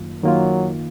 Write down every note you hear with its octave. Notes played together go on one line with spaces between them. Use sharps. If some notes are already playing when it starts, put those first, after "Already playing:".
Already playing: F#2 D#3 A#3 F4
D#3 F#3 A#3 F4